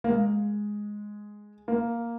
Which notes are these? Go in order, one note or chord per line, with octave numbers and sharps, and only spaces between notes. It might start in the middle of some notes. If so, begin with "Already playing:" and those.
A#3
G#3
A#3